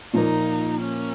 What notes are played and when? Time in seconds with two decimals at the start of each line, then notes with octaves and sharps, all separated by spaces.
0.13 A#2 F3 A#3 D#4
0.81 C#4